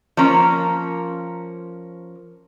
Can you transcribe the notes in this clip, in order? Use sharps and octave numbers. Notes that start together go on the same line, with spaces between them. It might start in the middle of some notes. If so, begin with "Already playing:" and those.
F3 A#3 C#4 A#4